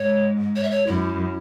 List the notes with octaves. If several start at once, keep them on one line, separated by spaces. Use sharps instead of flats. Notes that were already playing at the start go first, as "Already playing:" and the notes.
Already playing: G#2 C#5
C#5
E5
C#5
F#2 E4